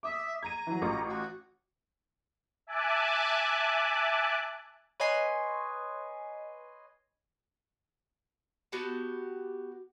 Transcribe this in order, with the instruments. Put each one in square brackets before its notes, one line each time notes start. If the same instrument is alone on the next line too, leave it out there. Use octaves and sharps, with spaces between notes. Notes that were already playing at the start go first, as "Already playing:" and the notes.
[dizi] E5 [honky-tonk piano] D6 D#6
[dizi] A#5 [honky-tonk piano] G#6 D#7
[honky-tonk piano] E3 F#3
A1 F4 C#6
[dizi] F#4
[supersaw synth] E5 G#5 A5 D6 F#6
[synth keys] B4 C#5 D#5 G#5 C6
[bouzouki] B3 F#4 G4 A5